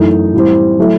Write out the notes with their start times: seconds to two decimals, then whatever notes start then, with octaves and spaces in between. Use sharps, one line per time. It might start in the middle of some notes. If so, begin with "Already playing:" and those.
Already playing: F#2 E3 A3 D#4
0.34 A2 E3 G3 C4
0.79 F#3 A3 E4